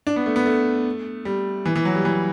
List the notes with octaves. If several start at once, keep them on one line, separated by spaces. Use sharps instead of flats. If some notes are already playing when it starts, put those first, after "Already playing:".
D4
B3
A3
B3
A3
G3
E3
E3
F#3
G3
E3